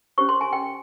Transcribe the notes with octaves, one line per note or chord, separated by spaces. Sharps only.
C#4 G4 C5 C#6
C6
G#5
G5